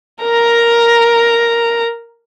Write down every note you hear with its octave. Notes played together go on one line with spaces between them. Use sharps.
A#4 A#5